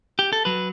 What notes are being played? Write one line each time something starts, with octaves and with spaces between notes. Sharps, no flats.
G4
A4
F#3 B4